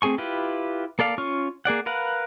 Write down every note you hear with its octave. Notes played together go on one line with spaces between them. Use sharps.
A3 C4 G#4 G#5 C#6
E4 F4 G4 B4
A#3 A4 D5 F5
C#4 F4 C#6 F6
A#3 G#4 D5 F#5
A#4 B4 F5 F#5